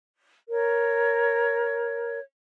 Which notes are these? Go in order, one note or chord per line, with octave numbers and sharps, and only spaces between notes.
A#4 C#5